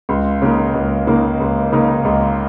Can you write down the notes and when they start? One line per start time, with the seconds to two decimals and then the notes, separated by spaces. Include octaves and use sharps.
0.09 C#2
0.42 C#3 A#3 D#4 A#4
0.74 C#2
1.07 C#3 A#3 D#4 A#4
1.40 C#2
1.72 C#3 A#3 D#4 A#4
2.05 C#2